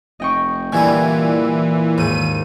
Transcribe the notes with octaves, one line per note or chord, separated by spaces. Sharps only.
F1 D#5 G5 C#6
A#2 D3 E3 G3 E4 G#5
D#2 G#2 D#7